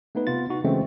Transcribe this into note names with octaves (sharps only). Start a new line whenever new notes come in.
A3 B3 D#4 B4
C3 B3 F4 A6
D#4 F#4
C#3 E3 G#3 A3 C4 C#4